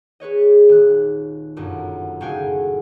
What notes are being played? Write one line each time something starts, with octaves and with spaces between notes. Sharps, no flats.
G#4 B4 C#5 D#5
D#1 F#6
G1 F#2 A#2
F#1 A2 F#4 F5 G5 G#5